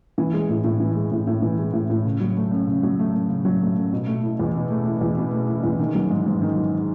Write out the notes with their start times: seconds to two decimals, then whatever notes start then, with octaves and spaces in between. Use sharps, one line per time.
0.18 E3
0.34 G#3
0.49 A2
0.64 A2
0.80 E3
0.96 G#3
1.11 A2
1.27 A2
1.42 E3
1.59 G#3
1.73 A2
1.90 A2
2.05 C#3
2.21 F#3
2.37 A3
2.51 F#2
2.67 C#3
2.83 F#3
2.99 A3
3.15 F#2
3.29 C#3
3.45 F#3
3.61 A3
3.76 F#2
3.93 B2
4.07 A3
4.23 E4
4.39 E2
4.55 B2
4.70 A3
4.85 E4
5.01 E2
5.17 B2
5.32 A3
5.49 E4
5.63 E2
5.79 D#3
5.95 F#3
6.11 G#2
6.26 G#2
6.42 D#3
6.57 F#3